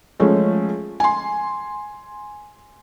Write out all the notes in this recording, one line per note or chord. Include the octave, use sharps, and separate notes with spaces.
F3 G#3 A3 C#4
G#5 C6